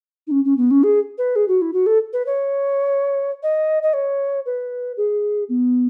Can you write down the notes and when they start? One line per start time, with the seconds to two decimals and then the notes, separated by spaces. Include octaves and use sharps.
0.27 D#4
0.31 C#4
0.45 C#4
0.57 B3
0.71 C#4
0.83 G#4
1.18 B4
1.36 G#4
1.48 F#4
1.62 E4
1.73 F#4
1.86 A4
2.13 B4
2.26 C#5
3.43 D#5
3.83 D#5
3.93 C#5
4.46 B4
4.97 G#4
5.49 B3